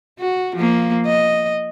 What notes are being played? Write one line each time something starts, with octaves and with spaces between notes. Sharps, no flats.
F#4
F3 A#3
D#5